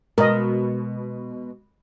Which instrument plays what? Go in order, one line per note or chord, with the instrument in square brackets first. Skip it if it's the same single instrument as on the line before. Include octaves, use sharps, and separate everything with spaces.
[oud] B2 [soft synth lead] G#3 [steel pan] A#4 D#5